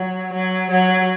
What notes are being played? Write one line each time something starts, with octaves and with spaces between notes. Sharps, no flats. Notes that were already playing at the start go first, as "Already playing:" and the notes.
Already playing: F#3
F#3
F#3